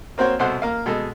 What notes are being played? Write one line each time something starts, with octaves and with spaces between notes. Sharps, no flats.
A#3 C4 F#4 C5 C#5
C2 B2 A4 C5 F#5 C6
A#3 F5
B2 G#3 A4